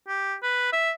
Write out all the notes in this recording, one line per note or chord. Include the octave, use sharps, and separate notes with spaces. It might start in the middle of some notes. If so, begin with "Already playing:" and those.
G4
B4
E5